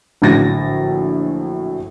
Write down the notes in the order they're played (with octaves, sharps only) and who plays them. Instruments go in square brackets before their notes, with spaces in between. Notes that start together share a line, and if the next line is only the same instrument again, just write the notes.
[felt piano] A#1 A2 D3 F#3 A6 A#6